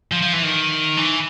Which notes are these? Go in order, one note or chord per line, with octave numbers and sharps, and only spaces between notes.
F3
F3
E3
D#3
E3